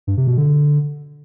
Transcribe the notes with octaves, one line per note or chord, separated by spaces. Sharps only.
G2
C3
B2
D3